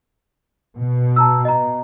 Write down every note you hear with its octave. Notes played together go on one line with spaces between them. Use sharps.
B2
A5 A#5 E6
D#5 A#5